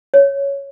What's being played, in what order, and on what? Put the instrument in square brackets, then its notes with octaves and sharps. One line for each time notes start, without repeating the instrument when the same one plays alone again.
[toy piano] C#5